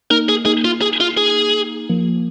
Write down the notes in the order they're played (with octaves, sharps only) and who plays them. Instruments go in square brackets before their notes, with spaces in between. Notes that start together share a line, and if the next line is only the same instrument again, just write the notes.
[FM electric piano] A#3 D#4 [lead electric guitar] A#4
[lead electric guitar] G#4
[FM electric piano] A#3 D#4 [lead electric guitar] G#4
[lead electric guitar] F4
G#4
F4
G#4
[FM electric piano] F3 A#3